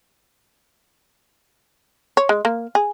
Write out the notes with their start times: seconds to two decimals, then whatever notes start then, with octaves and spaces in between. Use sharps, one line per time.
2.17 C#5
2.29 G#3
2.45 A#3
2.75 G#4